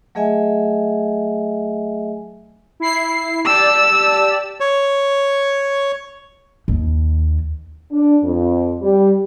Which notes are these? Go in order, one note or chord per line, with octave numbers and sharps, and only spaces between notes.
F#3 A3 G#4 D#5 E5 G#5
E4 C7
G4 D5 A5 E6
C#5
D#2
D4
F2
G3